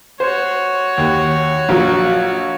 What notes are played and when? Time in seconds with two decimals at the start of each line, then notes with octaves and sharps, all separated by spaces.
0.20 F#4 C5 C#5
0.98 D#2
1.69 A#1 F#3